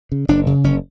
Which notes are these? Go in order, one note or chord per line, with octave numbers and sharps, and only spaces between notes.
C#3
F#1 D4
C#3
F#1 C#4